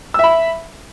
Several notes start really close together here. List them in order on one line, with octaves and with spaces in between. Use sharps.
E6 E5 B5